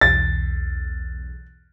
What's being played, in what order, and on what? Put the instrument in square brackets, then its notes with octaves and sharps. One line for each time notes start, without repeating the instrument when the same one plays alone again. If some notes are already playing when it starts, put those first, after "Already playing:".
[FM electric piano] B1 E2 [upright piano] A6